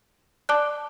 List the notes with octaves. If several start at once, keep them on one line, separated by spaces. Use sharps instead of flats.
D5 A5 D6 F#6